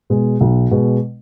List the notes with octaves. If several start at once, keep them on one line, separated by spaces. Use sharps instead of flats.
B2 G#3
B1
B2 G#3